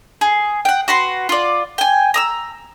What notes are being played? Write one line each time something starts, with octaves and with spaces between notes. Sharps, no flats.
G#4
F#5 G5
F#4 B4 C6
F4 D5
G5 G#5
A#5 D#6 E6